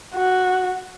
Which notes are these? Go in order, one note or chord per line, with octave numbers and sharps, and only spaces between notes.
F#4